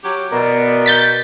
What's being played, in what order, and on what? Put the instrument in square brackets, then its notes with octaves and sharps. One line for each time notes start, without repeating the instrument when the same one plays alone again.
[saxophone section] F#3 C#4 G4
[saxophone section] B2 [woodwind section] E3 B3 D5 [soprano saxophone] A#4
[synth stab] G6 A6 B6